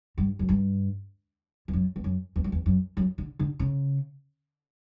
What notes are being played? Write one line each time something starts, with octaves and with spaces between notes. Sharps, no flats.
G2
F#2
G2
E2
F#2
E2
F#2
E2
F#2
E2
F#2
F#2
D3
D3
C#3